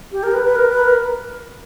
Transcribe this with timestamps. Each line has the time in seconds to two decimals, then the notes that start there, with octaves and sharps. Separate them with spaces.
0.12 G4
0.23 A#4
0.34 B4
0.44 B4
0.55 A#4
0.69 B4
0.84 A#4